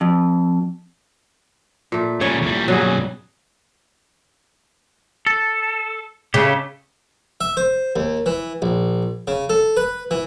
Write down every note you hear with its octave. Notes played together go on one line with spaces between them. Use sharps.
F2
A#2 A3
C#3 G3 C#5
E2 G3
F#2 B2 F#3 G3 G#4
A4
C#3 A3 G4
E5
C5
D#2
E3
A#1
C#3
A4
B4
E3